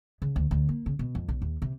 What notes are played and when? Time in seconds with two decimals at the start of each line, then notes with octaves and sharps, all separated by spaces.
0.22 C#3
0.36 D2
0.51 D2
0.69 A#3
0.86 C#3
0.99 B2
1.15 F2
1.28 B1
1.42 D#2
1.62 C3